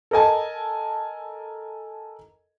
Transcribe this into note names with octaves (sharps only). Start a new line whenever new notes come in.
A4 A#4 D#5 G#5 A5